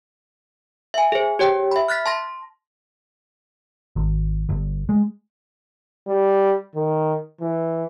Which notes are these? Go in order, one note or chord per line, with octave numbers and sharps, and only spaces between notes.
E5 G#5
G#4 C5
G4 C#5 G5
E5 B5
F6 F#6 A6 B6
A5 C6 A#6
G#1
G1
G#3
G3
D#3
E3